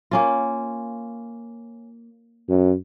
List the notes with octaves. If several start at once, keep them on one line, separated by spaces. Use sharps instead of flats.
A#3 C#4 F4
F#2